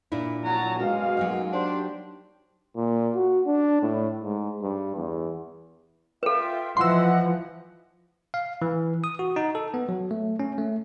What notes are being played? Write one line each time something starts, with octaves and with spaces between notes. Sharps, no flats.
A#2 D4 E4
F#3 A5 A#5
F#2 B2 G#3 F#4 F5
F#3 A#3 D#4
D4 G4 C5
A#2
F#4
D4
A2
G#2
G2
E2
F4 A4 B4 E5 G5
E3 F3 D#5 E5 F#5 C6 E6
F5
E3
D#6
F#4
D#4
A4
B3
F#3
A3
C#4
A3